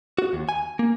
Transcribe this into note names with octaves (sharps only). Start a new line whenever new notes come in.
F#4
D#2
G#5
A#3